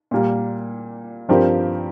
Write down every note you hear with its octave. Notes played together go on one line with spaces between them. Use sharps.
A#2 G3 A#3
G2 F3 C4 G4 A#4